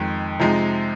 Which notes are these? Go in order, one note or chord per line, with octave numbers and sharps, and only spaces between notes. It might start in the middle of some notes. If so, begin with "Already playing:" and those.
Already playing: F2 D#3 G#3
C3 F3 G#3 D#4